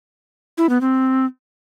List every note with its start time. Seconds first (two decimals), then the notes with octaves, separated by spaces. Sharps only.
0.58 E4
0.69 B3
0.81 C4